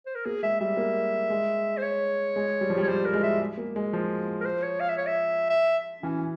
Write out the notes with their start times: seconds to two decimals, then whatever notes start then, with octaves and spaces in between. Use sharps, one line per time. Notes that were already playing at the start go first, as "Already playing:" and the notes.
0.06 C5
0.15 A#4
0.26 A#3 G#4
0.43 G#3 E5
0.60 G3 E5
0.77 A#3
1.30 G#3
1.77 C5
1.83 C#5
2.36 G#3
2.61 G3
2.70 F3
2.77 G3
2.84 C#5
2.88 G3 C5
3.05 A#4
3.14 G#3
3.23 E5
3.40 G#3
3.57 A#3
3.76 G#3
3.93 F3
4.41 A#4
4.45 C5
4.63 C#5
4.80 F5
4.89 E5
4.97 C#5
5.07 E5
5.50 E5
6.02 E3 C#4